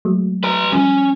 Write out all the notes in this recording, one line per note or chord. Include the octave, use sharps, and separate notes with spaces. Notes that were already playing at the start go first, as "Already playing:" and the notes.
F#3 G#3 A3
B4 A#5
F3 G3 C#4